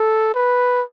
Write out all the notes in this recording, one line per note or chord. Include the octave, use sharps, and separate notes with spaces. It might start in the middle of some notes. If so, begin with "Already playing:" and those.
Already playing: A4
B4